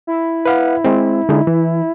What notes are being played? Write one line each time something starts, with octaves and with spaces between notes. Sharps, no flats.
E4
B4 F5 F#5
G#3 C4
D3 G#3 D#4
E3